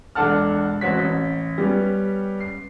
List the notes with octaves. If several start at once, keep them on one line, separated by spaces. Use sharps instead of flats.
E1 D4 A4 F#5 A5 F6
A1 C4 F#4 C#5 B6
A1
G3 B3 C#4
C7